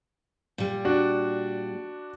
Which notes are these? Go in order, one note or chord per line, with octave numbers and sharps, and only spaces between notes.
A#2 G3
D4 F#4